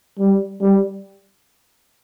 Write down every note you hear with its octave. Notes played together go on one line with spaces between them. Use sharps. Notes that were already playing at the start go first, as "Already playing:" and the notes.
G3
G3